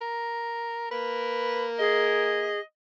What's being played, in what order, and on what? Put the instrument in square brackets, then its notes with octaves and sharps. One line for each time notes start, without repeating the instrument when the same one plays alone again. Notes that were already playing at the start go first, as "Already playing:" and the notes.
[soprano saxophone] A#4
[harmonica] A#3 A#4 [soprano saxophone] B4
[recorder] G#4 [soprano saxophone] D#5